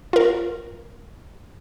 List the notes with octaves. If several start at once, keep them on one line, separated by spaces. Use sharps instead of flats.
F4 A#4